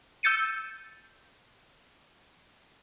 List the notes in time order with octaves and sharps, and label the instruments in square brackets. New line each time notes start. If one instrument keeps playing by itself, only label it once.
[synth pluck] E6 G6 A6 C#7 D#7